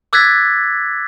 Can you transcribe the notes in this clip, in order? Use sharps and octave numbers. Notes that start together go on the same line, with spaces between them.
D6 E6 F#6 G#6 A6 B6